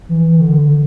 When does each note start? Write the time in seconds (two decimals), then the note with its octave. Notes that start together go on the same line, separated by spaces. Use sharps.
0.09 E3
0.38 D3
0.68 D3